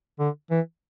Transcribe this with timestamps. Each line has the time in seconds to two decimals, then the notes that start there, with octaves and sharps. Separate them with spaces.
0.20 D3
0.51 E3